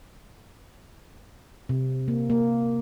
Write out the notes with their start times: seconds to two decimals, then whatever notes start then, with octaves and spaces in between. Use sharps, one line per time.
1.69 C3
2.08 A#3
2.30 A#3